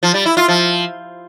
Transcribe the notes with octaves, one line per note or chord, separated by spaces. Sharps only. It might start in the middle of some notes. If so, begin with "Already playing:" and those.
F3
G3
E4
F4
F3